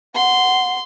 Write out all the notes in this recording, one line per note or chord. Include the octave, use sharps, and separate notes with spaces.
F#5 C6